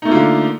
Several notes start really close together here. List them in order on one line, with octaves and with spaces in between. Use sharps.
D#4 A3 A#3 F4 D3